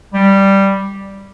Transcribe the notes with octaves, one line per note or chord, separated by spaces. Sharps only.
G3